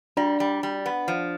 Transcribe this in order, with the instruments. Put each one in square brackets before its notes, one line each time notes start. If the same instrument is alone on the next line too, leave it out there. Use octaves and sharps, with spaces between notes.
[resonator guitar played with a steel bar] G3 [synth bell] D4 D5
[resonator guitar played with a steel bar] G3
G3
B3
F3